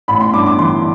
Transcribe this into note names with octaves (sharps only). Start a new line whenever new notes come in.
A1 B5
C6
G2 D6
D6
E3 C6